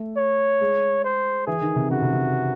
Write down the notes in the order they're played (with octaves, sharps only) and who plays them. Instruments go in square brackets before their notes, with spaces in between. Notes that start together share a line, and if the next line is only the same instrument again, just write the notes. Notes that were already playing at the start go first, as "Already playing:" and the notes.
Already playing: [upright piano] A3
[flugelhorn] C#5
[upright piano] G#3
[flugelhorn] C5
[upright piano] E3 [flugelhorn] G#4
[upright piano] D#3
C3
[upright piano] C#3 [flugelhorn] F#4
[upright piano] C3
C3